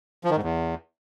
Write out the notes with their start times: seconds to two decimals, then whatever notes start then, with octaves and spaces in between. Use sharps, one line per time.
0.24 F3
0.30 D#3
0.37 G#2
0.43 E2